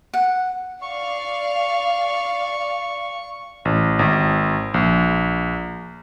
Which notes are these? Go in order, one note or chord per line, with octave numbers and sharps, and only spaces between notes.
F#5
D5 F5 C#6
A1
G#1
A#1